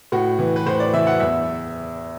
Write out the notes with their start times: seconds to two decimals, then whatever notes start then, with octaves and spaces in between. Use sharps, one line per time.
0.12 A2 F#4
0.39 E3
0.56 B4
0.66 A2 C5
0.80 D5
0.94 E3 E5
1.07 F#5
1.20 E2 E5